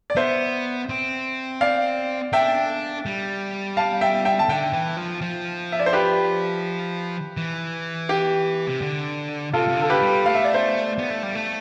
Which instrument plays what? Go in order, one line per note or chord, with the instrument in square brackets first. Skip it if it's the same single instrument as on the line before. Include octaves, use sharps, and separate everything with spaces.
[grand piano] D5
[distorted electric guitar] B3 [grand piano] C5 E5
[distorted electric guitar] C4
[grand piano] D5 F5
[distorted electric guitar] D4 [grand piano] E5 G5
[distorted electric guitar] G3
[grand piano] F5 A5
E5 G5
E5 G5
A5
[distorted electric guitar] D3 [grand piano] E5 G5
[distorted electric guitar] E3
F3
F3
[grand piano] E5
D5
C5
G4 B4
[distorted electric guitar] E3
[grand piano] G4
[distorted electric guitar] C3
D3
[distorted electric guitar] C3 [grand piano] F4 A4
[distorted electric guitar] C3
[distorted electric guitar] D3 [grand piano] A4
[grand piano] G4 B4
[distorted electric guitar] G3
[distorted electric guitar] A3 [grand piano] F5
[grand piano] E5
D5
C5 E5
[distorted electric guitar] B3
A3
G3
A3